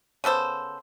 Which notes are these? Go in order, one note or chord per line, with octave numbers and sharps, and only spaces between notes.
C#3 B3 A4 C5